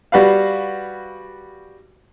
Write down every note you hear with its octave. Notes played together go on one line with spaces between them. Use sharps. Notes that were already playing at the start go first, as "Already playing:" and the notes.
G3 F#4 B4 F5